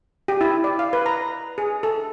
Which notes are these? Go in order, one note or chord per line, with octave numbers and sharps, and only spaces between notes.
G4
E4
D5
F5
B4
A#5
G#4
A4